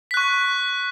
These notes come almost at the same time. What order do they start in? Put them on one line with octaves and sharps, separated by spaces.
B6 F#6 C#6